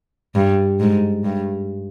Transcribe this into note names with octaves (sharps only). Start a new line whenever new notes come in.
G2
G#2
G2